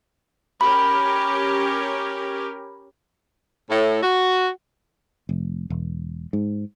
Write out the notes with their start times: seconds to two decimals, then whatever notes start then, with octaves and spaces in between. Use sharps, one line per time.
0.61 C#4 G4 A#4 B5
3.70 A2
4.03 F#4
5.29 F1
5.70 E1
6.33 G#2